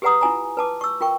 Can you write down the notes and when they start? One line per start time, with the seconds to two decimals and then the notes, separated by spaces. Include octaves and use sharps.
0.02 G4 G#4 B4 F#5 A#5 D#6
0.21 E4 F4 G#5 A#5
0.57 B4 A5 D6
0.81 C#6 E6
1.01 F4 A#4 G5 C#6